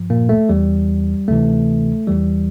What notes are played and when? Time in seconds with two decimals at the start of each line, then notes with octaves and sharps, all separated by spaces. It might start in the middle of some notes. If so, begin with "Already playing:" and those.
Already playing: G2 F3
0.10 A#2 A#3
0.29 A3
0.49 E2 E3 G3
1.28 D2 C3 E3 A3
2.07 E2 E3 G3